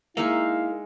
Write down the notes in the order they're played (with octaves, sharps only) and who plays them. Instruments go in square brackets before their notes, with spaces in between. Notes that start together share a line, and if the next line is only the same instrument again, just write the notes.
[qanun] G#3 D#4 E5 [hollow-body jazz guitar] A#3 [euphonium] E4 [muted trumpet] F5